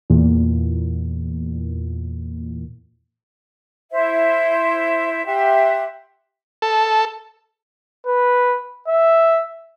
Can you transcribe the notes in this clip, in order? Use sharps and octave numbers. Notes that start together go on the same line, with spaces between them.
E2 A#2
E4 C5 E5
G4 E5 F#5 C6
A4
B4
E5